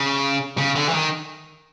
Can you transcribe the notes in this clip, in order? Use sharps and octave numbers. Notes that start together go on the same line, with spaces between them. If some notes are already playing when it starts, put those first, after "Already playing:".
Already playing: C#3
C#3
D3
E3
D#3